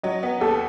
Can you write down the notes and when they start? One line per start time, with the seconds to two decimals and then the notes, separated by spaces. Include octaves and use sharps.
0.03 F#3 C#5 D#5
0.23 B3
0.41 D#2 G4 A4